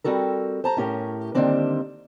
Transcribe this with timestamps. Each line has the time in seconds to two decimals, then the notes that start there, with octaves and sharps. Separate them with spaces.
0.04 G3 C4 F#4 A4 A#4
0.64 C5 A5 A#5
0.77 A2 C#4 G4 A#4
1.35 D3 D#3 G3 A#3 C4 D4